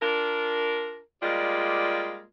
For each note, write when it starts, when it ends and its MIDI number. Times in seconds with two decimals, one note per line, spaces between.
0.01 1.00 62
0.01 1.00 65
0.01 1.00 70
1.22 2.23 55
1.22 2.23 56
1.22 2.23 58
1.22 2.23 65
1.22 2.23 74